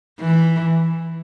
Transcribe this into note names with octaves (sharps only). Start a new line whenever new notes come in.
E3